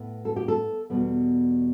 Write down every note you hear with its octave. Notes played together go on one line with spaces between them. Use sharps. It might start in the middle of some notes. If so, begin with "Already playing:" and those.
Already playing: A2 B3
A4
G4
A4
E2 B2 G3 B3